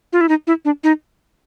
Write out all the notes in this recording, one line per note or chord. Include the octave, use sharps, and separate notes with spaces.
F4
E4
D#4
E4
D4
D#4